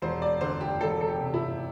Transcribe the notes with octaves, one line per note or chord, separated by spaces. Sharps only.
E1 C5
D5
D3 C5
G4
E1 A4
A4
G4
C3
E4